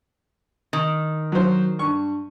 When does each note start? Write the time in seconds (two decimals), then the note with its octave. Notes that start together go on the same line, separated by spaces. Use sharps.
0.73 D#3
1.32 F#3 C5
1.79 G2 C#6